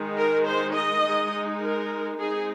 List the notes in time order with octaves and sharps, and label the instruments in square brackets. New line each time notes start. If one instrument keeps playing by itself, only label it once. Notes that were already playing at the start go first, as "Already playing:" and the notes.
Already playing: [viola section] D#3 G#3 D#4
A#4
C5
D#5
G#3 D#4
A#4
G#3 C4 D#4 G#4